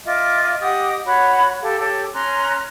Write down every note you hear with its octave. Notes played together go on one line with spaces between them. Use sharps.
F4 D#5 E5 D6
G4 D#5 F#5 D#6
F#4 C#5 F#5 B5
G4 A4 F5
G4 A4 C#5
C#4 A#5 C6 F#6